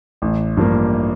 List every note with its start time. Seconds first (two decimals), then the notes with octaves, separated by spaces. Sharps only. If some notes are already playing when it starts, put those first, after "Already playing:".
0.22 A1
0.57 G2 F3 A#3